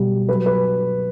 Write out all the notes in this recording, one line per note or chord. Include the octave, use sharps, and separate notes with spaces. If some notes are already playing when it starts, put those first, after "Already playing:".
Already playing: B2 G3
F#3 B4
B4